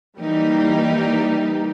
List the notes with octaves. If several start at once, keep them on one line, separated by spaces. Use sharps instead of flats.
E3 G3 A#3 D#4 G4